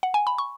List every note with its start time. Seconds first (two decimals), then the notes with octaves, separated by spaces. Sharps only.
0.03 F#5
0.14 G#5
0.27 B5
0.38 C#6